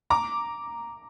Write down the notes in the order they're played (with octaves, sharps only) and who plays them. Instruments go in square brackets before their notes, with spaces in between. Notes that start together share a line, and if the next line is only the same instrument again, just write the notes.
[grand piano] A#5 D6